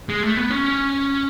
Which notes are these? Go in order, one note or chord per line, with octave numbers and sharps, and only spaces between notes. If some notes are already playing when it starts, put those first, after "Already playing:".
G#3
A3
B3
C#4